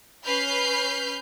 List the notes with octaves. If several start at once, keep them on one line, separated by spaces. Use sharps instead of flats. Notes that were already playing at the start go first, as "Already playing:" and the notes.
C#4 B4 B5 F6 G6 C7